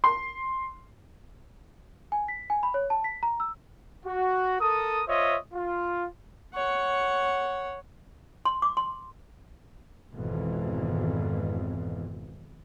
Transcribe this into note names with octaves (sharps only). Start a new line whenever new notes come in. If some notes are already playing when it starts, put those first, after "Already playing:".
C6
G#5
B6
G#5
B5
C#5
A5
B6
A#5
E6
F#4
A4 A#4 D#6
F4 C5 C#5 D#5 E5
F4
C#5 F#5
C6
D6
C6
G#1 F2 B2 E3